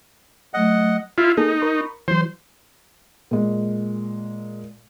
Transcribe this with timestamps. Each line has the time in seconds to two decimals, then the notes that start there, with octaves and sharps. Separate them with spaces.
0.54 F#3 A3 D#5 F#5
1.18 E4 F4
1.37 A#3 D#4 G#4 A4
1.61 A#4 B5 C#6
2.08 E3 F#3 C5
3.31 A#2 G#3